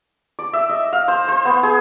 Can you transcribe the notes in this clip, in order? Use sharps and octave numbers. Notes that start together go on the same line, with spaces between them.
D5
E5
D#5
F5
C5
C5
B3
G#4